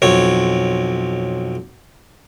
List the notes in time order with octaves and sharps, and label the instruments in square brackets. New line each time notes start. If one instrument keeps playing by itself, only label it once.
[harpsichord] B1 F2 C#5